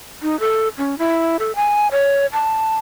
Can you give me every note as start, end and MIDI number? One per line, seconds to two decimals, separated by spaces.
0.22 0.39 63
0.40 0.68 69
0.78 0.98 61
0.98 1.37 64
1.39 1.52 69
1.56 1.87 80
1.92 2.26 73
2.33 2.77 81